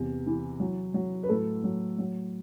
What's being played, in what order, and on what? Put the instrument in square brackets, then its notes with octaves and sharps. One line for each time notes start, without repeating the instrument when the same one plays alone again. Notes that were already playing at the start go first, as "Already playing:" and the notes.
Already playing: [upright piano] E2 C3
E3
F#3
F#3
B4
A2 A3 A4
F#3
F#3